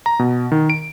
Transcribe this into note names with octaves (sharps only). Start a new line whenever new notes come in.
A#5
B2
D#3
D7